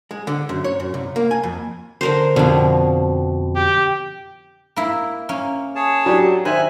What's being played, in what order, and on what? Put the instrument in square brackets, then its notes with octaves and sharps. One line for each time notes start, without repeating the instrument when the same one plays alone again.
[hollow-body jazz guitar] G#3
D3
F#2
C#5
F#2
C2
A#3
G#5
F2
[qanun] D3 A#4 C5
[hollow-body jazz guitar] F2 B2 [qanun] D3 F3
[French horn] G4
[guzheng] A#3 E4
A#3 C#4
[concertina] G#4 C#5 A5
[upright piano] F#3 D4 G4
[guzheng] D#3 [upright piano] C5 E5 [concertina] G#5 F#6